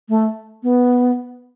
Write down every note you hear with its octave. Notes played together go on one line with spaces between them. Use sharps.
A3
B3